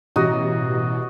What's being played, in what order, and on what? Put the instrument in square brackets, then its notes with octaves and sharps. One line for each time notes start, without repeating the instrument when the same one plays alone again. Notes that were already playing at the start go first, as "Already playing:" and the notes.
[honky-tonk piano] A1 G3 A#5 [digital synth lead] B2 [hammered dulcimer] F#4 D#5